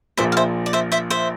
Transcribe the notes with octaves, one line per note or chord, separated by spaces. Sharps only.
A#1 A#2 F3 A#3 C5 E5
F5
C5 E5
D5
C5 E5
C5 E5
C5 E5